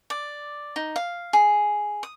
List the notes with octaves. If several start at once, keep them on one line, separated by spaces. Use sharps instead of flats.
D5
D#4
F5
G#4
D#6